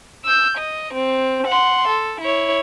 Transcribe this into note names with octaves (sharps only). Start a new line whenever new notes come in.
E6 G6
D#5
C4
F#5 C6
A4
E4 C#5